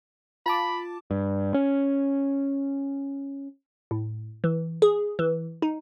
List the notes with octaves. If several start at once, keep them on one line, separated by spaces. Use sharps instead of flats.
F4 A5 B5 D6
G2
C#4
A2
E3
G#4
E3
D#4